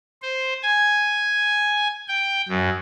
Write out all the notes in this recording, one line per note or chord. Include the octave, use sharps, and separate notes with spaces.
C5
G#5
G5
F#2